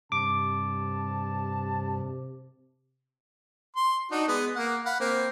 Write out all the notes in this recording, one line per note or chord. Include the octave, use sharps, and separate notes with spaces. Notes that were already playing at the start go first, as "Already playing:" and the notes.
G2 C3 A5 D6
C6
D4 D#4 F#4
G#3 B3
A#3 F#5
F5 F#5 B5
A#3 C4